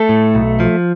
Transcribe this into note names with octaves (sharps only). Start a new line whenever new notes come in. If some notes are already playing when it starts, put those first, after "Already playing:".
Already playing: A3 A4
A2
B1
F3